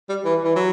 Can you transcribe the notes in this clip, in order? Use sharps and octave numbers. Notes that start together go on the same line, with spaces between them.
G3
E3
E3
F#3